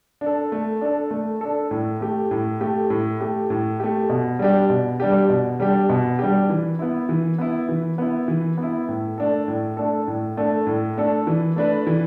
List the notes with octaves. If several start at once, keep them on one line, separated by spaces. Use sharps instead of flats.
D4
A4
A3
D4 A4
A3
D4 A4
A2
A3 G4
A2
A3 G4
A2
A3 G4
A2
A3 G4
B2
G3 D4 G4
B2
G3 D4 G4
B2
G3 D4 G4
B2
G3 D4 G4
E3
B3 E4
E3
B3 E4
E3
B3 E4
E3
B3
E4
A2
A3 D4 A4
A2
A3 D4 A4
A2
A3 D4 A4
A2
A3 D4 A4
E3
A3 D4 B4
E3